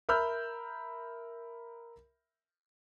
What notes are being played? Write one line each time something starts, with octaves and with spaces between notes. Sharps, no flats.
A#4 E5 B5 E6 F6 G6